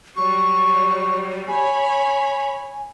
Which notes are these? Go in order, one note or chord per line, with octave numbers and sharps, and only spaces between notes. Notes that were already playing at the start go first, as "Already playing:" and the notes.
F#3 G3 C#6
C#5 G#5 B5